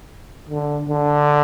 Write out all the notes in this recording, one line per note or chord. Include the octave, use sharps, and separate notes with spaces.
D3
D3